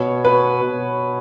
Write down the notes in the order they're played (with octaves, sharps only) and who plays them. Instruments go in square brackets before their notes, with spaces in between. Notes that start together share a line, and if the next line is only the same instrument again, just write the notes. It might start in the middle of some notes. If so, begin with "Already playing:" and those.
Already playing: [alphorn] B2 [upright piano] C#5
[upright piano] B4
[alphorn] B2